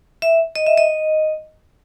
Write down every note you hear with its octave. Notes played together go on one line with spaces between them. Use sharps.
E5
D#5
E5
D#5